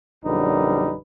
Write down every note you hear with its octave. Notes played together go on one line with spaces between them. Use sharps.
A#1 F#2 D3 G3 D#4 B4